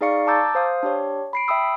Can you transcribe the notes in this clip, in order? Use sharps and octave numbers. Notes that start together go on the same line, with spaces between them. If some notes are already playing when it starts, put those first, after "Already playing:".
D#4 G#4 D5 F5 C#6 C#7
A5 A#5 D6 E6 G6 A6
C5 F5 D#6
D4 G4 C#5
B5 C7 D7
E5 G5 B5 D#6 E6